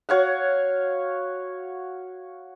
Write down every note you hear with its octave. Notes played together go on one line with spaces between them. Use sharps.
F#4 C#5 F5 F#5